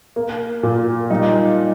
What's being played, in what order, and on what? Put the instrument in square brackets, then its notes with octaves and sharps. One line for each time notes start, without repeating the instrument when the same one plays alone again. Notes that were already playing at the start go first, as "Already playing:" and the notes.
[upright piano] A#3
A#2
G3 D#4